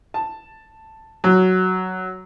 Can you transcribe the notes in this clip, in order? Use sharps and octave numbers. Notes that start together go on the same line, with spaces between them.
A5
F#3